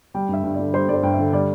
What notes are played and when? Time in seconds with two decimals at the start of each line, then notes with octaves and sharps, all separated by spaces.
0.14 G3 G5
0.29 G2 E5
0.44 G2
0.54 D3 D5
0.74 G3 C5
0.89 G2 D5
0.94 C5
1.03 G2 G5
1.14 D3 E5
1.33 G3 D5